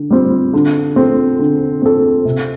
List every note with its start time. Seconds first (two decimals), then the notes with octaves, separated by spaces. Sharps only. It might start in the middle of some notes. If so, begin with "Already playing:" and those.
Already playing: D3
0.10 G3 C4
0.53 D3
0.96 C4 A4
1.39 D3
1.82 C4 A4
2.25 C3